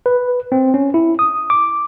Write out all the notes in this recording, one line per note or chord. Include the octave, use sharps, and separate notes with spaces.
B4
C4
C#4
E4
D#6
D6